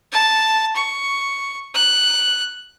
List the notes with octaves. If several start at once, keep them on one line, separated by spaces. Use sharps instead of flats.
A5
C#6
F#6